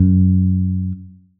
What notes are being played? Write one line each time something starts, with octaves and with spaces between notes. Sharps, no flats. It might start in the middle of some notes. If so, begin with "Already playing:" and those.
Already playing: F#2